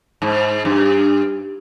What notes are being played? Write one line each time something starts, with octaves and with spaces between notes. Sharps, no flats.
G#2
G2